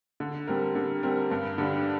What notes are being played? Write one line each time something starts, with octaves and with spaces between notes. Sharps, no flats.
D3
G3 C4 A#4
D3
G3 C4 A#4
G2
D3 G3 D4